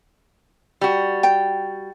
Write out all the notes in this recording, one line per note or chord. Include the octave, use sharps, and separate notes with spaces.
G3 F#4
G5